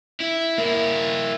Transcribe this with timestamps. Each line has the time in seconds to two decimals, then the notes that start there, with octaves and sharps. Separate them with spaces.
0.20 E4
0.58 A#3 E4